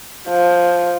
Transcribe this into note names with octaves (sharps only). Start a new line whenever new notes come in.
F3